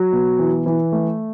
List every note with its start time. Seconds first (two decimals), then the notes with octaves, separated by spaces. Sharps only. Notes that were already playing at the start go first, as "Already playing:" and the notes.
Already playing: F#3
0.13 B2
0.39 E3
0.66 E3
0.92 A3